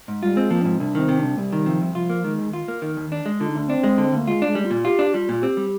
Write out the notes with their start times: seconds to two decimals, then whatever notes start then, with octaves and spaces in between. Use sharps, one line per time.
0.08 G#2
0.22 G3 F4
0.36 G#3 C4
0.50 F3 A#3
0.61 D4
0.65 G#2 C4
0.80 C2 D4
0.95 D#3 C4
1.08 C3
1.19 C2 D4
1.38 C2 G3
1.53 D#3
1.66 C3 F3
1.82 C2
1.95 F3 F4
2.10 A#3
2.24 D#3 G#3
2.39 D#2
2.53 F4
2.68 A#3
2.82 D#3
2.97 D#2
3.12 D4
3.26 G#3
3.40 D3 F4
3.49 D#4
3.55 D2 D4
3.69 C4 D4
3.84 G#3
3.98 D3
4.12 D2 A#3
4.27 G#3 F4
4.42 D4
4.47 G#3
4.55 G3
4.65 F4
4.71 A#2
4.85 F4 G4
4.99 D4
5.14 G3 F4
5.29 A#2
5.42 C4 G4
5.57 G3